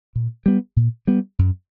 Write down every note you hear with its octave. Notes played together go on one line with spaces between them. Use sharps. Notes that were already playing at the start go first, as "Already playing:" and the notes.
A#2
G3 B3
A#2
G3 B3
F#2